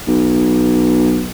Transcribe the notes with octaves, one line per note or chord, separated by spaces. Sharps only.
B1